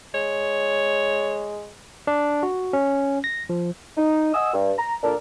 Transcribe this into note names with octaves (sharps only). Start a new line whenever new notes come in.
G#3 C#5
D4
F#4
C#4
A#6
F3
D#4
D#5 F#5 G#5 D#6 E6
G2
A#5
A#2 D4 A4 A#4